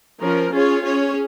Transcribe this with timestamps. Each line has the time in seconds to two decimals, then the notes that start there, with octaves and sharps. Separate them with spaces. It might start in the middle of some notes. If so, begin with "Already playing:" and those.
0.21 F3 C#4 A#4
0.52 C#4 F4 G#4 C#5
0.84 C#4 G#4 C#5